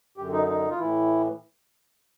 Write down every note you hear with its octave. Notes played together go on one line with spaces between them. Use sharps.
F#2 D3 G4
D#4
D#4
F4
A2 E3 E4